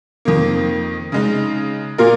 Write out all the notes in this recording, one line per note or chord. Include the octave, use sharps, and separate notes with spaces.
F2 D#3 A#3
C#3 G#3 D#4
A#2 A#3 F4 A#4